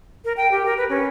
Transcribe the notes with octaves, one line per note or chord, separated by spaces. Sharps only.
A#4
G5
G4
A#4
B4
C#4